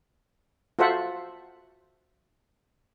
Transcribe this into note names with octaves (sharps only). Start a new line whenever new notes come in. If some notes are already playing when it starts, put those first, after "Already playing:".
F4 F#4 A4 C5 E5 F#5